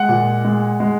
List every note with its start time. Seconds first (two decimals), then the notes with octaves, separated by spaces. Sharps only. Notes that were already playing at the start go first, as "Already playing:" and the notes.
Already playing: G#3 F#5
0.09 A#2
0.44 G#3
0.80 G#3